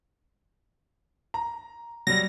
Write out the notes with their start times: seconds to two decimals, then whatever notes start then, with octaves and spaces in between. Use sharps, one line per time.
1.34 A#5
2.07 F#3 G3 A#6